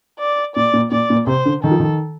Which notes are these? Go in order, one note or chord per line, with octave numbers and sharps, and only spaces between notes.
D5
A#2 D5
A#2
A#2 D5
A#2
C3 C5
D3
D#3 A4
F3
D#3